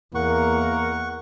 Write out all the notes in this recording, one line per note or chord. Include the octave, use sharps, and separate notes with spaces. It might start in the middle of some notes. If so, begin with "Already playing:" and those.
E2 A#3 A#4 F#5 C#6